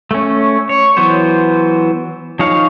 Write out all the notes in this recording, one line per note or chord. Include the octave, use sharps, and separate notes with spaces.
A3 C#4
C#5
E3 F#3 B3 C5
F3 D#4 G#4 C#5 F5